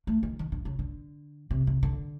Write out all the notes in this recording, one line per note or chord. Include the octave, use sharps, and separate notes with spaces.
A3
D#3
D#3
D3
C#3
D3
C3
C3
D3